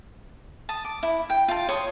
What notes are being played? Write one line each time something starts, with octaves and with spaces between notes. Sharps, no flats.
A5 D#6
D6
E4
G5
F4 A5
C#5 C6 D#6